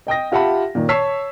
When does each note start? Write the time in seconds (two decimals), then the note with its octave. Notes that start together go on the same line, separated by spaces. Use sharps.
0.07 D#5 G5 D#6 A#6
0.32 F4 G4 E5 F#5 A5 B5
0.75 A#2 D#3
0.89 C#5 A5 C#6 E6 B6 C7